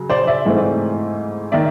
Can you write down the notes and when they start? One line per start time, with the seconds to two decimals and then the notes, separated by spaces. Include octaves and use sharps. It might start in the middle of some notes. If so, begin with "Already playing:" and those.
Already playing: C#3 F#3
0.10 C5 D5
0.27 D5 E5
0.46 G#2 E3 A3 C4
1.52 D#3 D5 E5